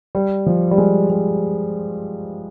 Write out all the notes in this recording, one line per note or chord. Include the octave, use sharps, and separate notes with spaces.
G3
F3
G3
G#3
G3